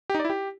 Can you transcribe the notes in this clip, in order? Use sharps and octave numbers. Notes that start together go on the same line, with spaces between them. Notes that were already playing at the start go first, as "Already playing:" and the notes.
G4
D#4
D5
E4
G4